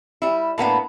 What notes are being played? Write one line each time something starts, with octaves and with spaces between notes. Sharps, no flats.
G3 E4
A2 A#3 B3 D4